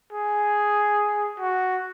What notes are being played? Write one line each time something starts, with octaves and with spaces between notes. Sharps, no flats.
G#4
F#4